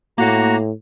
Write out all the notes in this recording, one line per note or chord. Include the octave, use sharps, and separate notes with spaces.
A2 A#3 F#4 A#5